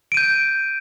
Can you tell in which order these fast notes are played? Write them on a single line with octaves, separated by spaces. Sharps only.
D7 D#7 G6